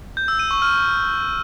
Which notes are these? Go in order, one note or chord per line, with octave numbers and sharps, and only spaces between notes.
G6
E6
D#7
C#6
F6